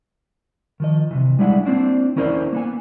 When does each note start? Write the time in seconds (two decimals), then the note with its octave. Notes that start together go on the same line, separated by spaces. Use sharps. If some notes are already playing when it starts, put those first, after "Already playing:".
0.80 D#3 F3 D#5
1.11 C3 D#3 E3
1.39 G3 G#3 D4 E4 D5 F#5
1.65 A#3 C4 D4 E4
2.16 E3 C#4 E4 A#4 C5 D5
2.53 A#3 B3 G#5